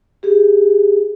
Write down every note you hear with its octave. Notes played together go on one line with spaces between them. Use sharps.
G4 G#4